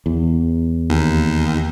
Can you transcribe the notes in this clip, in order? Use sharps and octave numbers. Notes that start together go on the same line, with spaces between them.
E2
D#2